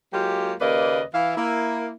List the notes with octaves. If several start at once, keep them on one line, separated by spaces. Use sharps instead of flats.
F#3 G#3 A#3 F4 G4
D#2 C#3 A#3 B4 D5 D#5
E3 E4 F5
A#3 E4